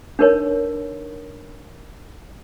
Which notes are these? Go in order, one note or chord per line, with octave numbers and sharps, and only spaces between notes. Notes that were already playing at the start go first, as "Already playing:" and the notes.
D4 D#4 A#4 B4 C#5 D#5